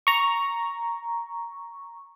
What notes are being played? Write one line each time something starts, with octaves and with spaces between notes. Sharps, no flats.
A#5 C#6